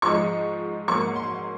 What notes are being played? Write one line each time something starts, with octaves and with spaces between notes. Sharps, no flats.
G#2 F3 G#3 D#4 C#6
G#2 F#3 A#3 C#6
C6